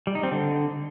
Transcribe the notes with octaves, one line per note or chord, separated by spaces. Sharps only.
G3
D#4
C4
D3